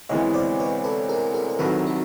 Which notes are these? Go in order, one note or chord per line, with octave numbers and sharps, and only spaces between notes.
D2 C3 E3 G#3 B3 C#5 D#5
C5 D5
B4 C#5
A4 B4
G#4 A#4
G#4 A#4
A#4
C2 C3 D#3 F#3 A4 B4
F#4